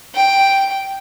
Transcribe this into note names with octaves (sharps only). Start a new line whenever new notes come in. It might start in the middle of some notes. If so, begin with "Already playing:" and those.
G5